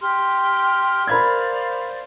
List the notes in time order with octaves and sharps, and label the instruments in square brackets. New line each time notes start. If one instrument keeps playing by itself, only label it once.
[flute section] G4 C6 F6
[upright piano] A#4 B5 G#6 [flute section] C5 D5 F5